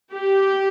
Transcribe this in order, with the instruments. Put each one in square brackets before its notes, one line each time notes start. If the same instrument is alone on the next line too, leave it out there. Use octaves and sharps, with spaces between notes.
[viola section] G4